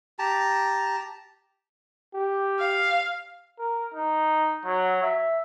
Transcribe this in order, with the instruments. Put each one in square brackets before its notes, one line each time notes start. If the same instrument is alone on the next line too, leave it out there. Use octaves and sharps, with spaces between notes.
[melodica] G4 A5 A#5
[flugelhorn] G4
[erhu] F5
[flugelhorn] A#4
D#4
F#3
E5